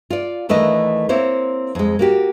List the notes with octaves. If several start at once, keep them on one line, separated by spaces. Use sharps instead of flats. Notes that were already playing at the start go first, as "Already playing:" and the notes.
F4 D5
D#2 E3 A3 D4 A#4 D#5
A#3 C4 E4 C5 C#5
F2 G#3
A#3 F#4 G4